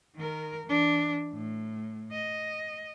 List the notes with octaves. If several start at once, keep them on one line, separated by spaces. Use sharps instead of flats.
D#3 A#4
E3 D4
A2
D#5